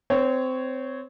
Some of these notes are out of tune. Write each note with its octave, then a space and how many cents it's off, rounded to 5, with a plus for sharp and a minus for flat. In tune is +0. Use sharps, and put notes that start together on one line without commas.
C4 -20 C#5 +0